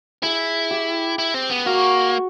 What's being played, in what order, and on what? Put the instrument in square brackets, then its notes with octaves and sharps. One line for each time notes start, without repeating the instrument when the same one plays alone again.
[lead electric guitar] E4 [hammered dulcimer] G#4
[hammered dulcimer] G4
[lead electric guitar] E4
C4
B3
[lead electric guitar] A#3 [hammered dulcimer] F#4